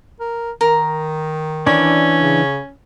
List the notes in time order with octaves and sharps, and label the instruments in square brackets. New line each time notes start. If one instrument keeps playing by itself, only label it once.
[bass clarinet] A#4
[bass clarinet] D#3 [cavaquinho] A#4
[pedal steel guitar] E3 D4 D5 [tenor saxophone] C#4 [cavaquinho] B5
[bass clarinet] C#3